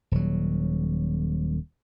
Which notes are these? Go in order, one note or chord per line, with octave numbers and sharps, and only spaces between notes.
D#1 F#3